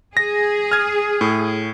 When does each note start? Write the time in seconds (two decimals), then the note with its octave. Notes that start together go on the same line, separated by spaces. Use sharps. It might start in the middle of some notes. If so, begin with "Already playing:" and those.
0.17 G#4 A#6
0.72 F6 G#6
1.21 A2